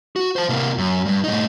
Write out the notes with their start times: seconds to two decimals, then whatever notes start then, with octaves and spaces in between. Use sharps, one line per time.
0.16 F#4
0.36 C5 A5
0.49 C3 A#3
0.78 F#2
1.06 G2
1.24 A2 D#4